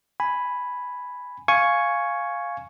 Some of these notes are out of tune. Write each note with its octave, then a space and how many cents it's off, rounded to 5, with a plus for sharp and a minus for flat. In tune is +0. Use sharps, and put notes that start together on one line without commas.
G#5 +0 B5 +0
F5 +0 G#5 +5 C#6 +0